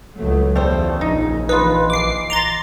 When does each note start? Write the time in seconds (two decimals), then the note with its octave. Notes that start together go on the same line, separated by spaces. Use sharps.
0.17 C#2 F#3 A3
0.56 E2 C#3 G3 A3 C5
1.01 A#1 D#4
1.49 E3 D#4 F4 B4
1.90 D6 C7
2.30 A#5 C6 A6